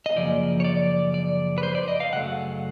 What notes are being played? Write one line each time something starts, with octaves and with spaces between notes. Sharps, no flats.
D#5
F#2 C#3 F3 A#3 D5
C#5
D5
D5
B4
C5
D5
D#5
F5
F#2 C#3 F#3 A3 F#5